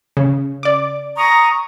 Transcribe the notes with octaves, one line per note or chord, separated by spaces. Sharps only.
C#3
D5 D6
A#5 C#6 D#6